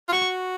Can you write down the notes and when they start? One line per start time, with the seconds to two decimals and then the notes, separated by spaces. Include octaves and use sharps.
0.09 F4
0.13 F#4 C#6